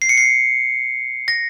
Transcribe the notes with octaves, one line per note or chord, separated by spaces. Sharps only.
C7
C#7
C7
A#6